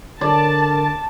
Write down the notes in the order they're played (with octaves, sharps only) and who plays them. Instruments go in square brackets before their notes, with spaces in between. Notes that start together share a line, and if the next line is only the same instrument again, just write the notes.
[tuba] D3 [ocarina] A#4 [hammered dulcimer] D5 [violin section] A5